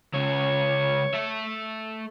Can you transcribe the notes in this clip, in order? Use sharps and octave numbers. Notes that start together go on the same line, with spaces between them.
C#2 C#3 C#5
A3 E5